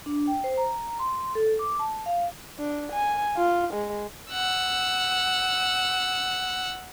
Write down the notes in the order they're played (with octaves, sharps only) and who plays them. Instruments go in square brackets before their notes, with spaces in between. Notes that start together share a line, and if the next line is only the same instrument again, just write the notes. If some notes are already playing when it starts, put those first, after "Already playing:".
[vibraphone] D4
G5
C5
A#5
C6
A4
D6
A5
F5
[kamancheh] D4
G#5
F4
G#3
[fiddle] F#5 E6